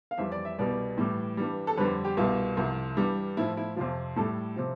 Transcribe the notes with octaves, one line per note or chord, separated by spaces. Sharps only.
F5
F2 E3 G3 E5
D5
E5
C2 B2 G3 D5
A2 E3 G3
G2 E3 G3
A4
F2 D3 G3 B4
G4
C2 B2 G3 F4
C2 C3 F3
G2 E3 G3
A2 F3 E4
E4
F2 C3 F3 F4
A2 G3 A4
C3 F3